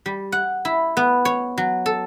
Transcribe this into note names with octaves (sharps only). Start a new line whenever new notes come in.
G3
F#5
E4
B3
C#5
F#3
A4